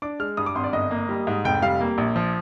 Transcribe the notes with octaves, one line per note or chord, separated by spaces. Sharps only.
D4 D6
G#3 F6
G2 D#6
D6
G#1 C6
D5
G1 D#5
A#3
G3
G#2
F1 G5
G3 F5
A#3
A#1
F3